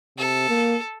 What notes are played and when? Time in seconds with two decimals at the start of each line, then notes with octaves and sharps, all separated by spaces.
0.18 C3 A4
0.49 A#3